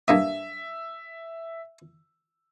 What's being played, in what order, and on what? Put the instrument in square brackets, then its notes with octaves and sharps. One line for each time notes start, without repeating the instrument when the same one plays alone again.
[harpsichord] G2 A#3 D#6 [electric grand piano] E5